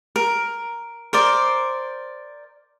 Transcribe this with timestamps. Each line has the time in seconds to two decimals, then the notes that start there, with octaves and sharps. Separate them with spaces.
0.16 A#4
1.13 A#4 C5 D5